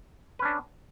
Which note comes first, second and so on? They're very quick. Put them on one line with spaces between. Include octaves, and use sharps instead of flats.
B4 C#4 D4